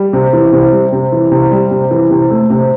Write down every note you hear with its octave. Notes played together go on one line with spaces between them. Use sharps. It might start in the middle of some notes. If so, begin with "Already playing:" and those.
Already playing: G3
C3
E3
C3
G3
C3
E3
C3
G3
C3
E3
C3
A3
C3